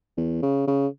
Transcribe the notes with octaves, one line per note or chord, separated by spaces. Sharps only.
E2
C#3
C#3